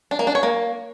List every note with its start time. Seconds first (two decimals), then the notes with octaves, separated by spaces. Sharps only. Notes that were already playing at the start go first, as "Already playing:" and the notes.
0.11 D4
0.19 A#3
0.27 D4
0.35 C#5
0.43 A#3